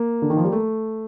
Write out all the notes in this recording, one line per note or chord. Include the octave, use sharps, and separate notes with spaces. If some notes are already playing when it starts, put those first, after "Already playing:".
Already playing: A#3
D3
D#3
F3
G3
A3